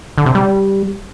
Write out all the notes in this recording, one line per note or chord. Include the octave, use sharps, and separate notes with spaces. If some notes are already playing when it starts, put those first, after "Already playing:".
D3
C3
G3